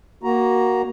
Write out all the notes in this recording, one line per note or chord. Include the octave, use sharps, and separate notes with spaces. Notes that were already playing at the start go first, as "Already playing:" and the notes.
A#3 F#4 A#5